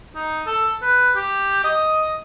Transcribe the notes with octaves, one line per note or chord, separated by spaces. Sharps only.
D#4
A4
B4
G4
D#5